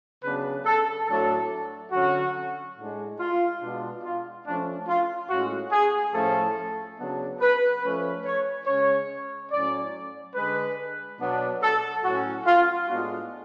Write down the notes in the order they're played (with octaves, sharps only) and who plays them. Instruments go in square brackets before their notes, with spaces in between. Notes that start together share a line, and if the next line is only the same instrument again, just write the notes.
[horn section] C#3 F#3 B3 D4 B4
A4
A2 F#3 A3 D4 A4
D3 F#3 C#4 F#4
A2 G#3 D4
F4
B2 G#3 B3 D4
F4
F3 A3 C#4 D4
F4
A2 G#3 C#4 F#4
G#4
A2 F3 A3 C#4 A4
C#3 F#3 B3 D4
B4
F3 A3 C#4 B4
C#5
C#3 G#3 C#4 C#5
A2 F#3 C#4 D5
D3 G#3 D4 B4
B2 F#3 B3 D4
A4
A2 F#3 C#4 F#4
F4
A2 G#3 B3 D4 F#4